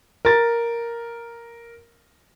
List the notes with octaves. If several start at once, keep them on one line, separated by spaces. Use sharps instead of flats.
A#4 A6